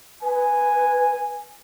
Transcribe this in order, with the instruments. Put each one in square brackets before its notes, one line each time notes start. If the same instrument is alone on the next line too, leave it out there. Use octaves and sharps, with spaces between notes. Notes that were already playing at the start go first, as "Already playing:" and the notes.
[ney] B4 [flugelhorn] G#5